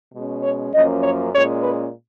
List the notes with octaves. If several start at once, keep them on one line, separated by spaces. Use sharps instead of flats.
B2 G#3 C#4
C#5
F#2 F3 A#3 C#4 D#5
C#5
A#2 G#3 C#4 C#5
B4